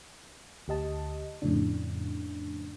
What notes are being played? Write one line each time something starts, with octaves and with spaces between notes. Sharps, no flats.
D2 G4 D#5 A5
F2 A2 C#3 D4